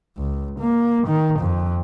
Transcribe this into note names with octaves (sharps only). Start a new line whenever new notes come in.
C#2
A#3
D#3
F2